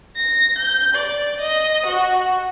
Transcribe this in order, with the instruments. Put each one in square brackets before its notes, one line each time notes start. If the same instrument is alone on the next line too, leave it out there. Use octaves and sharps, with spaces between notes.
[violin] A#6
G6
D5
D#5
F#4